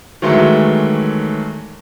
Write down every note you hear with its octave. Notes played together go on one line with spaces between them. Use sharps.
D#3 E3 F#3 G#3 A3